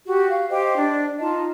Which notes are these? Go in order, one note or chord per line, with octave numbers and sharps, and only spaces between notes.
F#4 G4
F5
G4 C5 D#5 G5
D4
D#4 F4 D#5 A5